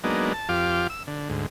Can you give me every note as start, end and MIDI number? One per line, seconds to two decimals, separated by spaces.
0.04 0.33 54
0.04 0.33 56
0.04 0.33 58
0.04 0.33 59
0.04 0.33 62
0.04 0.33 63
0.34 0.48 81
0.49 0.87 41
0.49 0.87 65
0.49 0.87 67
0.49 0.87 77
0.49 0.87 86
0.90 1.03 88
1.07 1.29 50
1.29 1.46 38
1.29 1.46 44